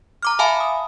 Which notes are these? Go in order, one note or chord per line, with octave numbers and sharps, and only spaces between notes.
A#5 D6 F6
E5 F5 G#5 A5 B5
D#6